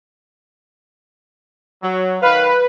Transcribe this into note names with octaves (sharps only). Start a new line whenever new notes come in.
F#3
D#3 B4 F5